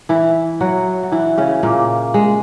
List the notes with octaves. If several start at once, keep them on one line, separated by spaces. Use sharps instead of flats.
E3 E4
F#3 F#4
F#4
E3 E4
C#3 C#4
A#2 A#3
G#3